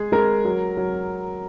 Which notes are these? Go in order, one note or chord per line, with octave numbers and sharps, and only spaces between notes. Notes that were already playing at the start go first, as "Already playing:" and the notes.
Already playing: G#3 G#4
G#3 A#4
F#3
F#3